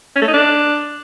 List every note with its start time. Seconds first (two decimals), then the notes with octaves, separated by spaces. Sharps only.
0.16 C#4
0.22 A3
0.28 D#4
0.34 D4